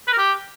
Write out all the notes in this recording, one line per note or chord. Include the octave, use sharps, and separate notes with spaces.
B4
A#4
G4